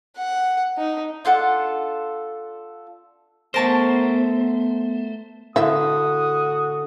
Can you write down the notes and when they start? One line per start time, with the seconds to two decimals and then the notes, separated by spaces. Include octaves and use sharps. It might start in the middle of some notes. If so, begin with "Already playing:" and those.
0.17 F#5
0.77 D#4
1.25 D4 F4 A4 F#5
3.54 A3 B3 A#4 C5 A5 C#6
5.56 A2 D3 E4 F#4 E5 D#6